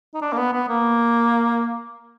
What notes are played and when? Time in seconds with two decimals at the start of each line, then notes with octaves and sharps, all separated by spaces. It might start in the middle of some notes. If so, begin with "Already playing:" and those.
0.14 D#4
0.22 D4
0.33 A#3
0.37 B3
0.53 B3
0.69 A#3